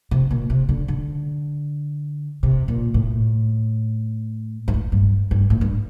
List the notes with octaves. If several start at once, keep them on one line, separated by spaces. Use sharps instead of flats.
C3
A#2
C3
D3
D3
C3
A#2
A2
G2
A2
G2
G2
A2
G2